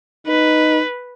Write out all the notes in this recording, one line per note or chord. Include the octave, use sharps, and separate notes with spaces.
D#4 B4